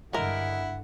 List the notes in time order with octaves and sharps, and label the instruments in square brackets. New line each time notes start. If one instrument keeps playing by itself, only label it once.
[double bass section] G2 D3 [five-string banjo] G#3 A#4 [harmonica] E4 F#5